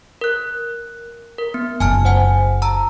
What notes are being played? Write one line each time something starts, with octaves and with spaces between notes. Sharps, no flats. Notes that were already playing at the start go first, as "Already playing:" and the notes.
A#4 F#6
A#4
B3
F#1 F4 G#5 A5 F6
C5 F#5 G#5
A5 A#5 E6